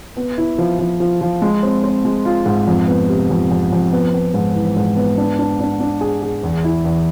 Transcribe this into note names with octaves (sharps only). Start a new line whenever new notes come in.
B3
E4
F3
F3
F3
F3
G#3
C4
C4
G#3
F4
G#2
F2
B3
C3
F2
F2
F2
B3
B3
G#2
E3
G#2
B3
D4
D4
D4
D4
G#4
G#4
E2
E4
E2